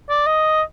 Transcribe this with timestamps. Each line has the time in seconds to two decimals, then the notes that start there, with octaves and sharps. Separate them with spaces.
0.10 D5
0.27 D#5